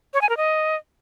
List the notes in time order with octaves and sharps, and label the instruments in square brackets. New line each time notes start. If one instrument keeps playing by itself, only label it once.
[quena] C#5
G#5
A#4
D#5